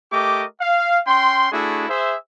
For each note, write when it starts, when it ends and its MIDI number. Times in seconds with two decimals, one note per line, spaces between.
0.13 0.45 57
0.13 0.45 67
0.13 0.45 70
0.13 0.45 75
0.13 0.45 86
0.61 1.00 77
1.07 1.51 61
1.07 1.51 79
1.07 1.51 84
1.52 1.89 57
1.52 1.89 62
1.52 1.89 64
1.52 1.89 66
1.52 1.89 68
1.89 2.16 68
1.89 2.16 72
1.89 2.16 76